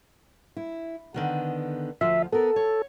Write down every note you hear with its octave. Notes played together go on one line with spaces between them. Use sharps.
E4
D3 D#3 B3
D2 F3 F4 E5
B3 A4 A#4
C#5